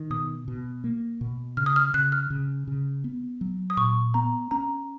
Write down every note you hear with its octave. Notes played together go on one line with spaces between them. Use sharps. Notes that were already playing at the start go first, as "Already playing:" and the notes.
Already playing: D#3
B2 D#6
B2
A#3
B2
C#3 F6
D#6
F6
C#3 F#6
F6
C#3
C#3
B3
F#3
D#6
A#2 C#6
B3 A#5
C#4 A#5